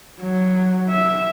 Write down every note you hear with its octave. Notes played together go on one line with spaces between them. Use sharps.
F#3
E5